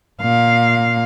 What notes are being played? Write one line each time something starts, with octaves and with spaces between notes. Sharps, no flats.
A#2 F5